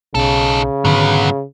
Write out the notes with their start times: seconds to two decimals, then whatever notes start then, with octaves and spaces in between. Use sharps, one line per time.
0.15 B1 C#3 D#4 A4
0.85 G#2 D3 D#3 F#3 B3